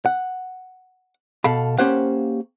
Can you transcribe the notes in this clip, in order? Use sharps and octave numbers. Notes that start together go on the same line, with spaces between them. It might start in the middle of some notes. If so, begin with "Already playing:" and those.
F#5
B2 A4 F5 B5
A#3 C#4 G4 C5 F5 F#5